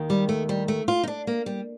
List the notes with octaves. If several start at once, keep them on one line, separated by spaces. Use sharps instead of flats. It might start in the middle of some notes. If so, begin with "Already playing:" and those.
Already playing: D#2 D#3
G3
A3
G3
A3
F4
D#4
D4
A#3
G3